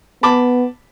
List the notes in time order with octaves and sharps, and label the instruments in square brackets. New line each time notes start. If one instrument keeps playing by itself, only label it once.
[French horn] B3 [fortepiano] A5 B5 D6